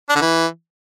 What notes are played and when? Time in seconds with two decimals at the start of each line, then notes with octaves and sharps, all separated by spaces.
0.10 D4
0.15 D3
0.21 E3